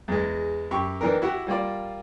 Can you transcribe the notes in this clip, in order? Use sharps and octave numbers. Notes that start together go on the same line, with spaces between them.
E2 G#3
F#2 G4 C#6
D#3 E3 D4 A#4
E4 F#4 G4 F#5
G3 A#3 F4 D5